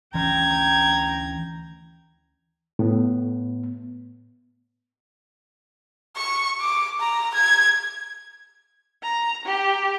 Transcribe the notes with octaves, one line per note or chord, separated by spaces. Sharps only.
D2 E3 C#4 G5 A#5 G#6
A2 B3
C#6
D6
A#5
G#6
A#5
G4